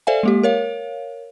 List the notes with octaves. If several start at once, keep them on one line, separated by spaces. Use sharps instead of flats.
A4 C5 D5 E5 F5 G#5
G#3 A#3 G4
A#4 C#5 F5